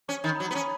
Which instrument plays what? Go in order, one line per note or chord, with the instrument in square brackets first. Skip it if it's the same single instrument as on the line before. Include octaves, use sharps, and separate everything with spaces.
[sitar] C#4 [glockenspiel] C#6
[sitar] D#3 [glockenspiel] B5
[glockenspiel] A#5
[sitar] F#3
[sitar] B3 [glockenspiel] A#5
[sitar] C#4
[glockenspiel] B5